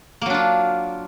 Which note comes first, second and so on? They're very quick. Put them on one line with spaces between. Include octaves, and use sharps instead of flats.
A#3 F#3 D4 F4